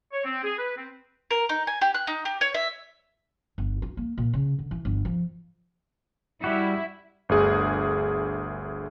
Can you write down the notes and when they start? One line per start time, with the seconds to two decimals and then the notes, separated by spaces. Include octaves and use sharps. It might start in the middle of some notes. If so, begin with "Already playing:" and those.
0.12 C#5
0.25 C4
0.44 G#4
0.58 B4
0.77 C4
1.31 A#4
1.49 D#4
1.67 G#5
1.81 G4
1.94 F#6
2.07 D#4
2.25 G4
2.41 C#5
2.54 E5
3.58 G1
3.82 F4
3.97 A#3
4.18 A#2
4.33 C#3
4.59 D3
4.71 E3
4.85 G1
5.05 F3
6.44 G3 E4 F#4
7.29 G1 D2 G#4